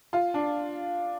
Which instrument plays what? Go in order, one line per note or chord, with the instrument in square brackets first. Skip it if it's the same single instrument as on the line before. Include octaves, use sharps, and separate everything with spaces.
[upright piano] F4
D4